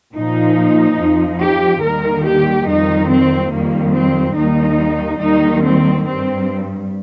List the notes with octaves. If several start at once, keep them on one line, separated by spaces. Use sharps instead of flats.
A#2 F3 D#4
F2 F3
G4
D#2 D#3 G3 A#4
G4
F2 D#3 G3 D#4
C4
F2 D#3 G3 A#3
C4
D#2 D#3 G3 D#4
D#2 D#3 G3 D#4
C4
G2 G3 C4